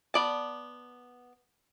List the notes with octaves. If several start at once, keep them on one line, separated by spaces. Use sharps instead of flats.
B3 D5 A5